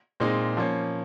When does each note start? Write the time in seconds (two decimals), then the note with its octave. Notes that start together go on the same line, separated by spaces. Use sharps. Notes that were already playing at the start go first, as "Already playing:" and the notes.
0.20 A#2 G#3 C4 D#4
0.57 F3 A#3 C#4